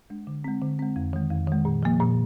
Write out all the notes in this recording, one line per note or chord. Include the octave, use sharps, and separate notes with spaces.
G#3 D4
D3
G#3 C4
D3
G#3 C4
F2
D#3 G#3
F2
D#3 G#3
A#2
F3 A#3
A#2